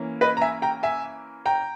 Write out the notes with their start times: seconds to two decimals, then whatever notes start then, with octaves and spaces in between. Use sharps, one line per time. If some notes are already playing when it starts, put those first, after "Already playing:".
Already playing: E3 A#3 C#4
0.21 B4 D#5
0.37 A#5
0.41 E5 G#5
0.62 G5 A#5
0.83 E5 G#5
1.46 G5 A#5